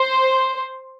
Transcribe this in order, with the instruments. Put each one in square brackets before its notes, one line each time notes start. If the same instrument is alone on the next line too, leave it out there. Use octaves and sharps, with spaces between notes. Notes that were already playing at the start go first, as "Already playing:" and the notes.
Already playing: [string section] C5